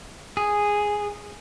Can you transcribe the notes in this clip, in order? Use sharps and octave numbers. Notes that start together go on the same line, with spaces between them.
G#4